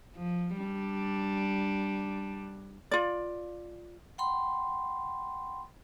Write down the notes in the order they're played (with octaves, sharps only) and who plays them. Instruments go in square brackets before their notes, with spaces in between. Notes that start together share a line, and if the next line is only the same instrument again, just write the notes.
[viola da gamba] F3
G3 D4
[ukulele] F4 D5
[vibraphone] F#5 G5 B5 C6